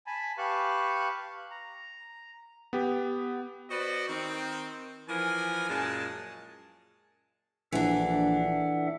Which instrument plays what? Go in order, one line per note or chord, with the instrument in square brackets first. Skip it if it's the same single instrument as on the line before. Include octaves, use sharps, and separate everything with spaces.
[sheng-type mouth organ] G#5 A5 B5
G4 B4 F5 A5 C#6 F#6
A#5
[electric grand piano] B3 G4
[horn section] F#4 B4 C5 D5 D#5
D#3 C4
E3 F3 A#4 G#5
F#2 A#2 G#3 G#4 A5
[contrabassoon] A#1 [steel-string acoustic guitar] E3 D4 [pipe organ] A4 E5 F#5